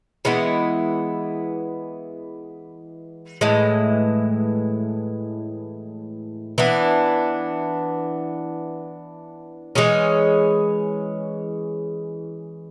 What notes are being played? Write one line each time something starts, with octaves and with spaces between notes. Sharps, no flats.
E3 G#3 B3 E4
A2 E3 G#3
E3 B3 D4
E3 G#3 C#4 G#4